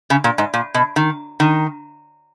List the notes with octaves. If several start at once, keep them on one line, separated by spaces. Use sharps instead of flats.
C#3
A#2
G#2
A#2
B2
D#3
D#3